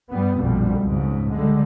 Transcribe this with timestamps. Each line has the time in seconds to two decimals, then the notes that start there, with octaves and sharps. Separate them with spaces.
0.11 G2 G3 B3
0.41 A#1 F2 B2 G3
0.81 C#2 G#2 C#3
1.32 D3 G3 G#3